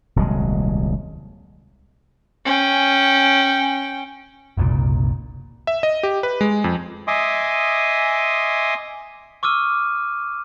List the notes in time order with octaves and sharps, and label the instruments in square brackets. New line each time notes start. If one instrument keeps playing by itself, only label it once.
[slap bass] D#1 C2 F#3 G#3
[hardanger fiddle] C#4 G5
[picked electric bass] F#1 C2 A#2
[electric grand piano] E5
D#5
G4
B4
G#3
F2
[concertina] D#5 E5 G#5 C6 D6 D#6
[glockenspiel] C#6 D6 E6 F6 D#7